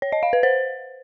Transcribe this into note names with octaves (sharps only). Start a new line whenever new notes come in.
C#5
D#5
F5
B4
C5